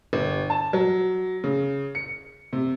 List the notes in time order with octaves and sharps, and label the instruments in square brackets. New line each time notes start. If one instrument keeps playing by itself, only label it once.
[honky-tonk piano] G1
A5
F#3
C#3
C#7
C3